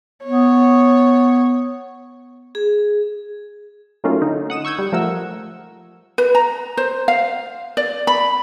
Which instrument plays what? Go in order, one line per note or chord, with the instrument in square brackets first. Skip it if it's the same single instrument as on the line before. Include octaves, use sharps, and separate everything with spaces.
[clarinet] B3 [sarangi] C#5
[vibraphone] G#4
[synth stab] F#3 A3 A#3 C#4 D#4 F4
D3 D#4
F#5 D#6 E7
C#6 E6 G6 G#6
G3
F3 A3 A#4 F#5 E6
[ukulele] B4
A#5
C5
F5
D5
B5